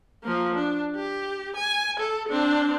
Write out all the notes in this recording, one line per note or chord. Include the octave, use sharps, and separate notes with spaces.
F3 A#3
D4
G4
G#5
A4
C4 D4